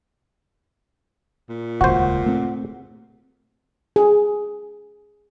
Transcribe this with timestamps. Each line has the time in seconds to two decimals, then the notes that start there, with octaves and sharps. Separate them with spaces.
1.49 A#2
1.81 D#1 C#2 F#4 C5 F#5
2.26 A3 C4
3.96 G#4